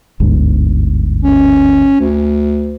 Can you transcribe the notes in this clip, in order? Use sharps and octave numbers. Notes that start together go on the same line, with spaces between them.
G1 D2 G#2
C#4
D2